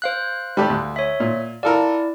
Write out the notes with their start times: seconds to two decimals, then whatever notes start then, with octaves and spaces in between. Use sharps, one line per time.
0.02 C5 F5 F#6
0.57 G3 A3 G4
0.70 D2
0.96 C#5 E5
1.20 A#2
1.63 E4 F4 A4 A#4 D5